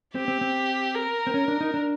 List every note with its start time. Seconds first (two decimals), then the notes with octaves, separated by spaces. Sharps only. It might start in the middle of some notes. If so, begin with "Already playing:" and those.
0.15 C4 G4
0.28 C4
0.41 C4
0.94 A#4
1.27 C4
1.34 C#4
1.48 D4
1.61 D#4
1.74 D4